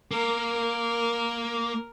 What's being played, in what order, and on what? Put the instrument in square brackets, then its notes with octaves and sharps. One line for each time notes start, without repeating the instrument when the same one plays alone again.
[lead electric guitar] A#3 [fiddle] A#4